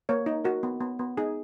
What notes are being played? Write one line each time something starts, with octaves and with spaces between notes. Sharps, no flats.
A#3 C#5
D#4
F#4 A#4
B3
B3
B3
D#4 G#4